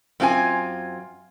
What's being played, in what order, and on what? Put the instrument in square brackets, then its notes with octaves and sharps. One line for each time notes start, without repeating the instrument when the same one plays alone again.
[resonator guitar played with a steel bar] F#2 C4 F4 G4 G#5